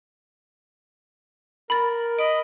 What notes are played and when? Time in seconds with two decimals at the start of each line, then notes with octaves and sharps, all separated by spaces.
1.70 A#4 B5 A6
2.19 D#5 B5 D7